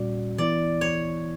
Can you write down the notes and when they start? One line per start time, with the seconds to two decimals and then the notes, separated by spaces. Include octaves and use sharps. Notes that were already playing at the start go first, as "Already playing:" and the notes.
Already playing: A#2 G3 C#4 F#4 D5
0.38 E3 B3 E4 D5
0.81 C#5